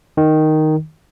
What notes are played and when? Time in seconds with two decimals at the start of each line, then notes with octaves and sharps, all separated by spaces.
0.17 D#3